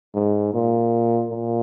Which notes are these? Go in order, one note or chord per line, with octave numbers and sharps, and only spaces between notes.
G#2
A#2
A#2